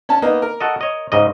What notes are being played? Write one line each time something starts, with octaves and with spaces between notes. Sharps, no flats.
C#4 A5
A#3 B3 D#4
A#4
F#4 A4 D#5
C#5 D#5
G#2 C#3 D#5